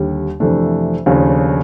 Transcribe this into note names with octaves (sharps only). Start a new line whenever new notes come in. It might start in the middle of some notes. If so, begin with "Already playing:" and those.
Already playing: D#2 D3 G3
F2 C3 E3 A3 D4
D#2 C#3 F3 A3 D4